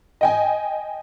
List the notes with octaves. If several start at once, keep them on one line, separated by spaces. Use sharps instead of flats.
D#5 G5 G#5